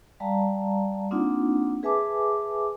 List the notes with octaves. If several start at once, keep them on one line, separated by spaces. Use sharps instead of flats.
G3 D5 F5 A5 A#5
A#3 C4 D4 D#4 F4 F#5
G#4 B4 E5 G#5 A5 D6